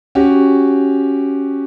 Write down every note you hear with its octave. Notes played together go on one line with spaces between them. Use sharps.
C#4 F#4 G4